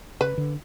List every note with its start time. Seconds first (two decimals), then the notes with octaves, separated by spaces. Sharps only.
0.21 C#3 B4
0.38 D3